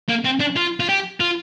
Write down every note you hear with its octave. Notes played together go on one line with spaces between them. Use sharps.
A#3
C4
D4
F4
F4
G4
F4